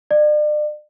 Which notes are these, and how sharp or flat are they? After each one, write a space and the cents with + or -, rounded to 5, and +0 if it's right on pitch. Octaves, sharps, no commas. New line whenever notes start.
D5 +40